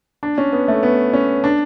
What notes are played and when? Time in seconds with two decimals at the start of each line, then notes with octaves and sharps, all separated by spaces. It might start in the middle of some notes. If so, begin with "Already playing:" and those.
0.23 D4
0.38 C#4
0.53 B3
0.68 A3
0.83 B3
1.13 C#4
1.44 D4